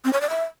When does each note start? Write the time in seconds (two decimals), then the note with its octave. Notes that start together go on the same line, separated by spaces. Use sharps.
0.05 C4
0.13 C#5
0.21 D5
0.30 E5